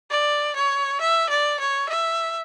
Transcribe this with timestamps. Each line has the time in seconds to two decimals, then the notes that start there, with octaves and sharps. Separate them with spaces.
0.11 D5
0.56 C#5
1.01 E5
1.29 D5
1.60 C#5
1.89 E5